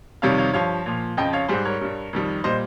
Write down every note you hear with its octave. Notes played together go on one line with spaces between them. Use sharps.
F2 C3 D#3 G3 C#5 F5
C#5 F5
G2 F3 C#5 F5
A#2 F3
F2 C#3 F3 D#5 G5
C#5 F5
G#2 G3 G#4 C5
A#4 C#5
G2 G3
F2 D#3 G3
A#2 G3 C5 D#5